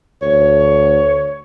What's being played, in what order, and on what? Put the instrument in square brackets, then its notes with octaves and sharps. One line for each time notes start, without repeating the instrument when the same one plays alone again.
[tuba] D2 [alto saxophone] C#5